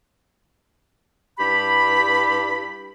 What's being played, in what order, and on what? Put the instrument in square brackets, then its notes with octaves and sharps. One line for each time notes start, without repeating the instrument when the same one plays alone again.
[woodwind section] G2 E4 G4 B5